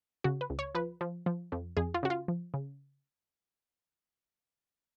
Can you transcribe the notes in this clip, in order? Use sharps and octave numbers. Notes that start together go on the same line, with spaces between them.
C#3 F#4
B4
C#2
C#5
F3 B4
F3
F3
F2
F2 G#4
F4
C#3 F#4
F4
F3
C#3